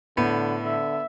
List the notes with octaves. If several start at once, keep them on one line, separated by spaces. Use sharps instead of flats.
A2 D3 B3
D3 E5